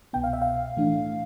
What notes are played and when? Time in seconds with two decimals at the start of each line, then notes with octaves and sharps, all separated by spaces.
0.13 C2 B2 B3 G5
0.24 F5
0.33 E5
0.42 F5
0.77 A2 E3 A3 D4